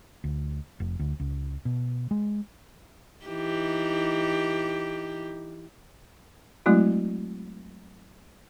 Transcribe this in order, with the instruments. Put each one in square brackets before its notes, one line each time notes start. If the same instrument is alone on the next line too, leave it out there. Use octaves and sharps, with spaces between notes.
[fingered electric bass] D2
F1
D2
C#2
B2
G#3
[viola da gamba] E3 D#4 G4
[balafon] F#3 G#3 A3 C4 E4 F#4